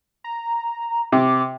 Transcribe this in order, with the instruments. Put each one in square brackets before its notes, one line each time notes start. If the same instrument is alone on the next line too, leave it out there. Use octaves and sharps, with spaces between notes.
[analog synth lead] A#5
[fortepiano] C3 [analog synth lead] D6